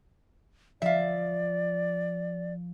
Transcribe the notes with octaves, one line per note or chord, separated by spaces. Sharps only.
F3 D5 E5 F5